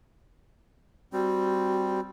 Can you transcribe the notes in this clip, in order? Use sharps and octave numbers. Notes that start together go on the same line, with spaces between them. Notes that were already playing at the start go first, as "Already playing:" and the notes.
G3 C4 F#4